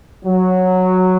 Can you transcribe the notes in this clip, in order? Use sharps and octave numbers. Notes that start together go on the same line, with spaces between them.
F#3